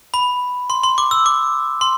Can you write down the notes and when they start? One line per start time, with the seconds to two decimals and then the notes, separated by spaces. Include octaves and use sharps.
0.14 B5
0.70 C6
0.83 C6
0.98 D6
1.11 E6
1.26 D6
1.81 C6